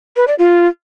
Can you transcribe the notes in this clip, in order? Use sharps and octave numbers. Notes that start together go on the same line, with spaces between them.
B4
D5
F4